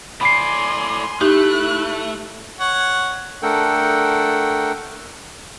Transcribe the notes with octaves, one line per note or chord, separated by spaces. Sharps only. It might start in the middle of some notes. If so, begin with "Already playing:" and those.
A2 D5 G#5 B5 C6 C7
A3 D#4 E4 G4 F#6
C#5 F#5
A3 D4 A4 A#4 F#5 G5